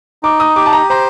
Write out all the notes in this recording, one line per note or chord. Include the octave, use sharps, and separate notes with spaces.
D#4 D6
D#6
G4 D6
A5
A#5
C5 A#5